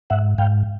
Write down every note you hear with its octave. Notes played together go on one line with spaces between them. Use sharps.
G#2 E5 F#5
G#2 F5 G5